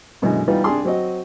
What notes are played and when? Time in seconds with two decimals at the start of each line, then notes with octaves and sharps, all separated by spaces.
0.22 F#2 B2 D3 E3 G#3
0.48 E3 G3 B3 D#4 F4
0.64 C2 D4 G#4 C6
0.85 F#3 C4 F#4 D#5